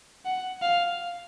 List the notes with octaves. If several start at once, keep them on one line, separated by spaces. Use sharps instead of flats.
F#5
F5